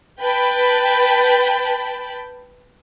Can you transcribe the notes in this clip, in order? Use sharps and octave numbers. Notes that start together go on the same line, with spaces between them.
B4 G5 A5 B5